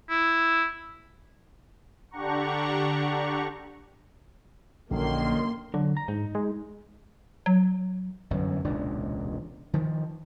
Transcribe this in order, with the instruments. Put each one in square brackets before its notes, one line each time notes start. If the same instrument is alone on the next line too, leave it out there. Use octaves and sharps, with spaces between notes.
[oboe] E4
[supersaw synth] D3 D4 G4 F#5 A#5 C#6
[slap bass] A#1 [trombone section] F#2 D#3 [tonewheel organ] D3 [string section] A#3 C6
[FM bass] D3 [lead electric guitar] F#3
[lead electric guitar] A#5
[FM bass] G#2 [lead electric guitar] D#4
[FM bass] G#3
F#3
[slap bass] G1 F#2 E3
E1 C#2 A#2 D4
D#3 F3